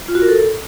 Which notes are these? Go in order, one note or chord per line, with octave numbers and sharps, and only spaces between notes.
F4
F#4
A#4
A4